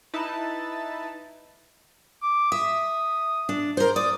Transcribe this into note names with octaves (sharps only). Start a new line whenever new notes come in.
D#4 E4 B4 A5
D6
E5 D#6
D4
A#4 C5
D5 D#6